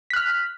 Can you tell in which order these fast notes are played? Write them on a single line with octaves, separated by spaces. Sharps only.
B6 F#6 F6